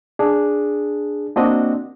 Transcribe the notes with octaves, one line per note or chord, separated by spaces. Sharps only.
D4 G#4
A#3 C4 D4 F#4 D#5